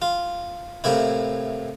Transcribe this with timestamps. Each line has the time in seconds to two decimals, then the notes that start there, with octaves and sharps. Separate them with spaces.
0.02 F4
0.84 A2 C3 A#3 E4